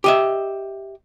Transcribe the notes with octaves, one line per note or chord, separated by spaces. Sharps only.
G4 D#5 E5